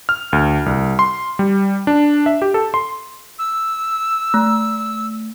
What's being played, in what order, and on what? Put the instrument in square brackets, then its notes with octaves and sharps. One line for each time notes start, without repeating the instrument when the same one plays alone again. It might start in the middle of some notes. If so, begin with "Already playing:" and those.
[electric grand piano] F6
D2
C2
C6
G3
D4
E5
G4
A4
C6
[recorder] E6
[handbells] A3